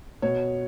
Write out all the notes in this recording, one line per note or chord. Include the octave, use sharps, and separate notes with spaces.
B2 C#5